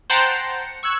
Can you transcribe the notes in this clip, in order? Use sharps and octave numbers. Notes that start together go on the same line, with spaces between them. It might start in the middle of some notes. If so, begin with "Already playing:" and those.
C5 F#5 G5 A5 A#5 C6
C#7
C#6 E6 F#6 G#6